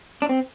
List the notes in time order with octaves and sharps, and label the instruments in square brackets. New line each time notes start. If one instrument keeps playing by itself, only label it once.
[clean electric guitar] D4
C4